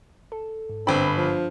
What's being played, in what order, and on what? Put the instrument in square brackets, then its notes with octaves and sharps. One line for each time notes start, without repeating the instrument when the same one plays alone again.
[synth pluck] A4
G#2
[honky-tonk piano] G1 B5 [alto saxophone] C4 [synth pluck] D4
[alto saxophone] F3